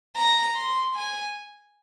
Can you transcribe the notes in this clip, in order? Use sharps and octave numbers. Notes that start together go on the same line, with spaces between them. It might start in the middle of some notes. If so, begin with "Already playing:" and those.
A#5
C6
G#5